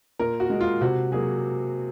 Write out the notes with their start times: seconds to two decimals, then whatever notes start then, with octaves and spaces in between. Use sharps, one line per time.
0.19 A#2 A#4
0.40 F#4
0.50 G#3
0.61 F4
0.81 C3 F#4
1.12 F#3 A#3 G#4